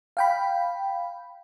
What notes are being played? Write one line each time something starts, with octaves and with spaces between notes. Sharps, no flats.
F5 G5 B5